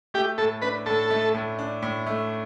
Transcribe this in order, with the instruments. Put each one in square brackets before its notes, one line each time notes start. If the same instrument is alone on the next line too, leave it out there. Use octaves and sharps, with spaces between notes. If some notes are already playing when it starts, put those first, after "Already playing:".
[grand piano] A3 [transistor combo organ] G4
[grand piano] A2 [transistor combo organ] A4
[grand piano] D4 [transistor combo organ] B4
[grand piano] A2 [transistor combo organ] A4
[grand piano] A3
A2
D4
A2
A3